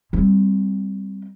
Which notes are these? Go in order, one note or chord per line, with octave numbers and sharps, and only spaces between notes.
G3 C4